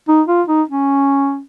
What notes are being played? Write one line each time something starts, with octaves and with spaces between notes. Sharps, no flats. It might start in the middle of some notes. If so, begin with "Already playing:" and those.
D#4
F4
D#4
C#4